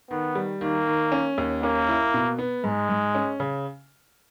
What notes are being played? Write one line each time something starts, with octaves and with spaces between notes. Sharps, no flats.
D#3 B3
G3
D#3 A#3
D#3
C#4
D#2
A#3 C#4
E4
B2
B3
G#2 G#3
G#2
C#4
C#3